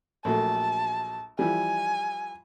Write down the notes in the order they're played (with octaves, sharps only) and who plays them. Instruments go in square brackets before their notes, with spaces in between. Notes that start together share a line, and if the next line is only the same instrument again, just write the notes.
[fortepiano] A#1 F#3 A3 [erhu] A5
[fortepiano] E3 F3 G3 [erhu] G#5